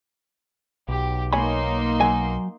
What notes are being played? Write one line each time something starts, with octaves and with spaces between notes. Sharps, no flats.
B1 G4
A#3 D#4 C#5 G#5 B5 C6
F#3 G#5